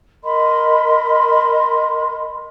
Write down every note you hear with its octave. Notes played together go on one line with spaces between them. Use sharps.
A#4 D#5 B5 C6